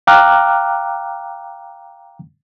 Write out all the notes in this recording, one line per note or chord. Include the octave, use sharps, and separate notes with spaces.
F5 G5 A#5 D6 F6 F#6